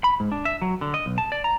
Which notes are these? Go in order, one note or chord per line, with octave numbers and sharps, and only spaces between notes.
B5
G#2
D4
E5
F#3
D3
D#5
B1
A5
D5
A#5